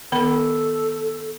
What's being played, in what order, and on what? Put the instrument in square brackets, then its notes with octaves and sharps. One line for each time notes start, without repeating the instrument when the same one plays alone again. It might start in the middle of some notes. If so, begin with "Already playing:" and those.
[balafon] D#3 B3 B5 [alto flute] A4